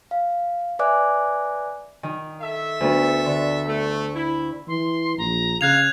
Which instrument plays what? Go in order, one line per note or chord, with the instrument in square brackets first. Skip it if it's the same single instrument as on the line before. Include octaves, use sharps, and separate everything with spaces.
[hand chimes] F5
B4 D5 E5 G#5 D6 F#6
[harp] D#3
[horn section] A4 E5
[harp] D2 B3
D3
[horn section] A3
E4
[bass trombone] E3 [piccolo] C6
[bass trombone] A#1 [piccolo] A#5
[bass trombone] C#3 [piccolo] F5 [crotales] F#6 G#6 F7